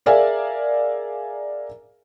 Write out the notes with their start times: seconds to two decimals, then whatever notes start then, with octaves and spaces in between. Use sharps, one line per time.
0.06 G#4 A#4 D5 E5 F5 G#5